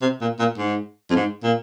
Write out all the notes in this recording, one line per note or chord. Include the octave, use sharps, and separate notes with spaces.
C3
A#2
A#2
G#2
F2
G#2
A#2